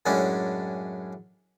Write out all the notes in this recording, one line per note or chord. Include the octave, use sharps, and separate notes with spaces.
F#2 A2 G#3 C#4 D4